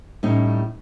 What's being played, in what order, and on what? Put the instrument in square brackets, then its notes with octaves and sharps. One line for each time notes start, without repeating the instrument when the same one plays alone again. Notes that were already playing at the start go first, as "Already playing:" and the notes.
[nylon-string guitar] A2 G3 C#4 D#4